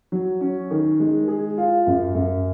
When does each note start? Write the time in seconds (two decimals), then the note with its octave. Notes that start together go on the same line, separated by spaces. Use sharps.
0.12 F#3
0.41 C#4
0.71 D#3
1.00 G#3
1.28 G#4
1.58 F4
1.87 F#2
2.15 F#2